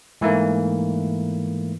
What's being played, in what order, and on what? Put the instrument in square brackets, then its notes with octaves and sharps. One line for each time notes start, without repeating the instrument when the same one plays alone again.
[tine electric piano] G#2 E3 A3 A#3